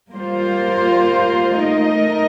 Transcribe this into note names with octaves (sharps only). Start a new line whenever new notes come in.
G3 A#3 F4 C5
A3 D#4 A#4 D#5